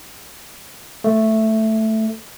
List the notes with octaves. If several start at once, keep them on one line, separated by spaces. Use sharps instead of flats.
A3